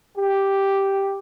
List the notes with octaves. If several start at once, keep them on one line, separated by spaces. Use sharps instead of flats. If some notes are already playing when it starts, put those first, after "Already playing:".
G4